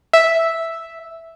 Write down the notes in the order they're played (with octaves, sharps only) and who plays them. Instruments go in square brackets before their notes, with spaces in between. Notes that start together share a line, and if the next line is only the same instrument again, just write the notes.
[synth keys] E5